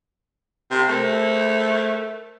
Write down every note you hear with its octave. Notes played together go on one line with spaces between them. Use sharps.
C3
A3 G#4 A#4 C5